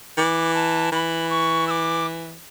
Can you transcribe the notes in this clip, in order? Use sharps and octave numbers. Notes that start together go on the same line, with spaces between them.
E3 D6
A5
E3 B5
C#6
E6
D6